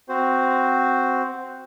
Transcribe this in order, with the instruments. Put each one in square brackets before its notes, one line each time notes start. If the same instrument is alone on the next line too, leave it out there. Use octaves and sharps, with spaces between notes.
[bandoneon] C4 F#4 C5